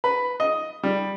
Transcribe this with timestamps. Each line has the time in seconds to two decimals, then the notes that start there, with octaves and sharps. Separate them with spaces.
0.04 B4
0.40 D#5
0.83 G3